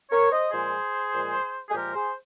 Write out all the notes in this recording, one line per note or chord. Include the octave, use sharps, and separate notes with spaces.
A#4 C#5
C5 D#5
A#2 F3 G#3 G#4 C5
A#2 F3 G#3
G#4
A#2 F3 G#3 G4 A#4
G#4 C5